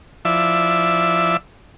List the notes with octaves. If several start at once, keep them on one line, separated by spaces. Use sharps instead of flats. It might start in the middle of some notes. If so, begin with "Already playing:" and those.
F3 E4 D5 E5